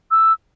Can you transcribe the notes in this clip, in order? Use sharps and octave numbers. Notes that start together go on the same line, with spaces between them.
E6